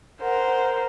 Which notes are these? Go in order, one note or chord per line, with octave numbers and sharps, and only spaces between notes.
A#4 C5 F#5